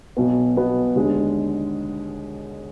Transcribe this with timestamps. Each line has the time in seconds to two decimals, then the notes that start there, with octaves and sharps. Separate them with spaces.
0.17 B1 B2 B3
0.56 B1 B2 B3
0.96 D#2 D3 G#3